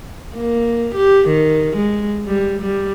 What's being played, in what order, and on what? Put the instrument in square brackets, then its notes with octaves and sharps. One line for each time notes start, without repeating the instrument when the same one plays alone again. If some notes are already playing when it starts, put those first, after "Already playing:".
[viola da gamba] A#3
G4
D#3
G#3
G3
G3